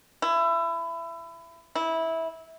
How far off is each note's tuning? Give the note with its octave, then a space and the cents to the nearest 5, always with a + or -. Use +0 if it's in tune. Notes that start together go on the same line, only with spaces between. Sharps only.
E4 +25
E4 -15